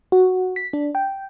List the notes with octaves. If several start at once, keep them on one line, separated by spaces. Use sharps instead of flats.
F#4
B6
D4
G5